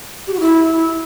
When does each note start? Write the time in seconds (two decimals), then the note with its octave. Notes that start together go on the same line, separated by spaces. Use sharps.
0.27 G4
0.34 F#4
0.40 E4